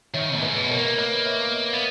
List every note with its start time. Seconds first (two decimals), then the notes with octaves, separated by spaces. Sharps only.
0.14 D#3 C#5 E5
0.36 G#2
0.43 B4 D#5
0.56 B2
0.70 A#4 C#5
0.77 A#3
0.98 A#3 B4 D#5
1.26 C#5 E5
1.54 B4 D#5
1.73 B3